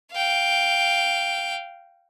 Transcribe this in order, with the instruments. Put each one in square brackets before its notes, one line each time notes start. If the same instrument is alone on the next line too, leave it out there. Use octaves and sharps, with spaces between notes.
[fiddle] F5 G5